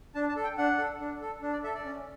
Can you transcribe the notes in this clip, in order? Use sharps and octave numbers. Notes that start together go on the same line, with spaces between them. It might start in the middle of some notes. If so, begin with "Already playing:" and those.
D4 A5
A5
A4
G5
D4 F#5
A4
D4
A4
D4
D5
A4 E5
D5
C#4